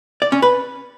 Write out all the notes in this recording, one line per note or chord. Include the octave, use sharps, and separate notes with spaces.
D5
C#4
B4